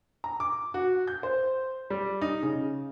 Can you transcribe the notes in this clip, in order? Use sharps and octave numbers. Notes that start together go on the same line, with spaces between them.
A#5
D6
F#4
G6
C5
G3
D#4
C#3